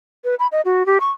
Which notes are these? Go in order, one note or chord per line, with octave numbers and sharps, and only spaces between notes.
B4
B5
D#5
F#4
G4
C#6